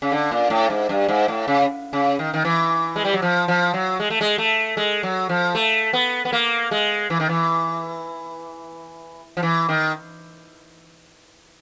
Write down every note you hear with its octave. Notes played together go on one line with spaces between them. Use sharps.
C#3
D3
A#2
A2
G#2
G2
G#2
A2
C#3
C#3
D#3
D#3
E3
G#3
G3
F#3
F3
F3
F#3
G#3
A3
G#3
A3
G#3
F#3
F3
A3
B3
B3
A#3
G#3
E3
D#3
E3
F3
E3
D#3